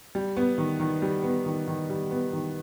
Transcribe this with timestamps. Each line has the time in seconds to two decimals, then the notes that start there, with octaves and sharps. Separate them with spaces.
0.15 G3
0.37 B3
0.58 D#3
0.79 D#3
1.02 G3
1.23 B3
1.46 D#3
1.68 D#3
1.89 G3
2.11 B3
2.33 D#3